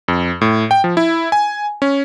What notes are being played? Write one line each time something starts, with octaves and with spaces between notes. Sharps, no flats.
F2
A2
G5
F3
E4
G#5
C#4